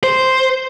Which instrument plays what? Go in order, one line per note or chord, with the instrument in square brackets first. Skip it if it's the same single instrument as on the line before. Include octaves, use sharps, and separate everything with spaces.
[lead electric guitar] C5